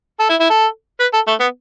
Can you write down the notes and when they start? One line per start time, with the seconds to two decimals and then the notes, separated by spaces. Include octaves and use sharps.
0.20 A4
0.30 E4
0.40 E4
0.50 A4
1.00 B4
1.14 A4
1.28 A3
1.41 B3